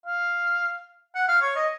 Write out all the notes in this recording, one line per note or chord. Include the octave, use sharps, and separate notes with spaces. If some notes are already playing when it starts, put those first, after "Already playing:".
F5
F#5
F5
C#5
D#5